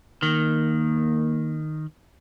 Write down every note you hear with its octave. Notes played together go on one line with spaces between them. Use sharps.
D#3 A#3